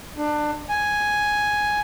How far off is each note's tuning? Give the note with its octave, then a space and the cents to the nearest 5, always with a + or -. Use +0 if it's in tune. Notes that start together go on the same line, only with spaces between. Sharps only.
D4 +25
G#5 +5